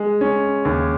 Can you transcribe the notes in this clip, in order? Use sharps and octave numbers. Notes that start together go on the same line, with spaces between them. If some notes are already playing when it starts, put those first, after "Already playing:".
Already playing: G#3
C#4
D#2